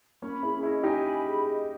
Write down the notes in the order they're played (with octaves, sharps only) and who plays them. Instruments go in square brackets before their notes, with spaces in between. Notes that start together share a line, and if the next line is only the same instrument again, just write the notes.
[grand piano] A#3 C#4 [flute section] B5
[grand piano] C#4 E4 [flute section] G#4
[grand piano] C#4 E4 [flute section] D#5
[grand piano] D#4 G4 [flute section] G#5
[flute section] B5
G#4
D#5